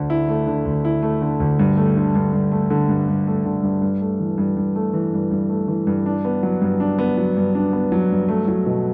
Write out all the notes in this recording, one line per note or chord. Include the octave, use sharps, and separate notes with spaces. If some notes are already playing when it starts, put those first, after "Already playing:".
Already playing: D2 D3 A3
E4
A3
D3
D2
E4
A3
D3
D2
G2
A3
D3
G2
G2
A3
D3
G2
G2
A3
D3
G2
G2
A3
E3
G2
G2
A3
E3
G2
G2
A3
E3
G2
D4
B3
F#3
G2
D4
B3
F#3
G2
D4
B3
F#3
G2
A3
F#3
B2